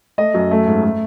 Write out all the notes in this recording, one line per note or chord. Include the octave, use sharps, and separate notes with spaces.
A3 D#5
F#2
A3
G#2
A3